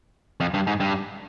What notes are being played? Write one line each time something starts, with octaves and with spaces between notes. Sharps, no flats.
F2
G2
G#2
G2